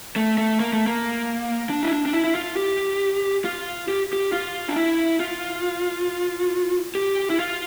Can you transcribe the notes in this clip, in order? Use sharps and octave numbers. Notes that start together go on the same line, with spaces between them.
A3
A3
A#3
A3
A#3
D4
E4
D4
D4
E4
E4
F4
G4
F4
G4
G4
F4
D4
E4
F4
G4
E4
F4